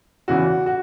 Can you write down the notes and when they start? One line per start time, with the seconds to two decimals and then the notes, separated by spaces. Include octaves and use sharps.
0.28 E2 C#3 E3 F#4
0.66 F#4